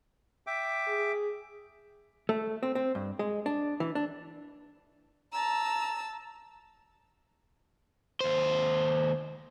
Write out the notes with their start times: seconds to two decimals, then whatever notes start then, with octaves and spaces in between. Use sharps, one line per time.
0.47 E5 G5 D6
0.88 G#4
2.29 A3
2.63 C4
2.75 C4
2.95 G2
3.19 G#3
3.46 D4
3.80 E3
3.95 D4
5.33 A5 A#5 E6
8.21 D#2 C5